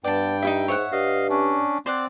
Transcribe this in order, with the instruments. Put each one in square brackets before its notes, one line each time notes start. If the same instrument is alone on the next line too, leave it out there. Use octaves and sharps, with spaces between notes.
[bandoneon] G2 G5 [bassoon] B3 [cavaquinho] D5 A5
[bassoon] G3 [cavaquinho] D#4 E4 E5
[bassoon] G#2 [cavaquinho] C#5 E5 F#5
[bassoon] G2 [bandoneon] D#5 F5
[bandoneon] C#4 D4
[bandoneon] C4 [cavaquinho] C5 D5 F#5